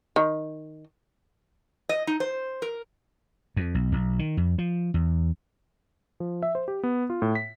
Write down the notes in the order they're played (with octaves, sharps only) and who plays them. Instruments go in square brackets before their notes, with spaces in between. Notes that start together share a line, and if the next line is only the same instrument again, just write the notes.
[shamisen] D#3
[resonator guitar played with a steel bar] D#5
D#4
C5
A#4
[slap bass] F2
B1
B1
D#3
F2
F3
E2
[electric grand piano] F3
E5
C5
G4
B3
F4
A2
B6